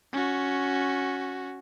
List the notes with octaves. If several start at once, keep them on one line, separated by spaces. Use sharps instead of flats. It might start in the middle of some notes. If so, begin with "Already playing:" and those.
C#4 F#4